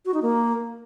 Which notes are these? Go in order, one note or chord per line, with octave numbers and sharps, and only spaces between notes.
F#4
D#4
A#3